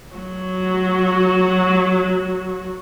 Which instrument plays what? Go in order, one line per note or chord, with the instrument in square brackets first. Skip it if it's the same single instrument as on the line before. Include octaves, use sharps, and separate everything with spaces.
[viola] F#3 F#4